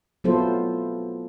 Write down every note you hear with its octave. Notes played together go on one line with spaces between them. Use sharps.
F#3 B3 E4 F4 A4 C5